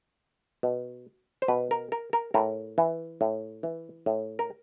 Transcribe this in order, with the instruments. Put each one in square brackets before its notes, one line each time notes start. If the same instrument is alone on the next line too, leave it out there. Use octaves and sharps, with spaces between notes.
[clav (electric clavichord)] B2
C5
B2 B4
A#4
A#4
A#4
A2 A#4
E3
A2
E3
A2
A#4